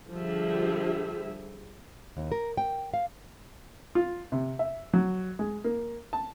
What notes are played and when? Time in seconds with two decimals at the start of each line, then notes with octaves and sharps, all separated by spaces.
0.12 D3 F3 G3 G4 G#4 E5
2.17 D#2
2.32 A#4
2.57 G5
2.94 F5
3.95 F4
4.32 C3
4.59 E5
4.93 F#3
5.39 G#3
5.64 A#3
6.13 A5